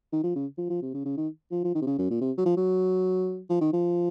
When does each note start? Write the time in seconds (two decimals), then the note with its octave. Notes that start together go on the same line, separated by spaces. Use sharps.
0.12 D#3
0.23 F3
0.35 C#3
0.58 F3
0.70 F3
0.82 C3
0.94 C#3
1.05 C#3
1.17 D#3
1.51 F3
1.64 F3
1.75 D#3
1.82 C3
1.86 C#3
1.98 F#2
2.10 A#2
2.21 C3
2.38 F#3
2.45 F3
2.57 F#3
3.50 F3
3.61 D#3
3.73 F3